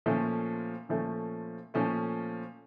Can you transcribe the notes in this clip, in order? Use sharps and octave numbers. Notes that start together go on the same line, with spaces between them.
A#2 F3 A3 C#4
A#2 F3 A3 C#4
A#2 F3 A3 C#4